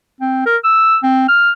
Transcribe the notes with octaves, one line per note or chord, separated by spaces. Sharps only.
C4
A#4
E6
C4
F6